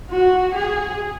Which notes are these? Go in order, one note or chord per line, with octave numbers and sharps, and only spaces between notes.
F#4
G#4